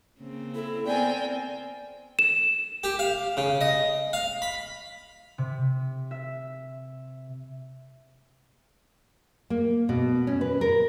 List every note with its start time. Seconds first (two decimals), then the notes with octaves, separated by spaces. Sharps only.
0.18 C#3 A#3 C4
0.55 E4 A4
0.86 B3 C4 A#4 D5 G5 G#5
2.19 E7
2.84 G4
2.99 F5
3.37 C#3
3.61 D#5
4.13 F5
4.42 B5
5.38 C3
6.11 E5
9.50 A#3
9.89 B2
10.27 C#4
10.41 B4
10.61 A#4